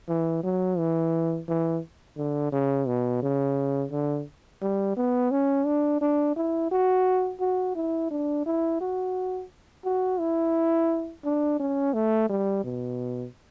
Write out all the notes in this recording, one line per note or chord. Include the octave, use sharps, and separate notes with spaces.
E3
F#3
E3
E3
D3
C#3
B2
C#3
D3
G3
B3
C#4
D4
D4
E4
F#4
F#4
E4
D4
E4
F#4
F#4
E4
D4
C#4
A3
G3
B2